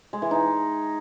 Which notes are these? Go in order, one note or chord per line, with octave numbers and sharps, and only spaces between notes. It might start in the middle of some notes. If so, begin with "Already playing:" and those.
G#3
E3
D#4